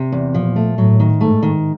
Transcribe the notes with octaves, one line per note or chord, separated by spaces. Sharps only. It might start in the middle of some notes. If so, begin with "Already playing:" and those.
Already playing: C3
E2
A#2 F3
A3
A2 F#3
D#3
G#2 A3
D#3